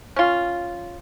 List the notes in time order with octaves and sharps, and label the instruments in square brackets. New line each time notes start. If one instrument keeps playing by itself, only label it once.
[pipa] C#4 F4